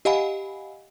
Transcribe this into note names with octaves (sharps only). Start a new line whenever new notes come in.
G4 D#5 F5 F#5 G#5 B5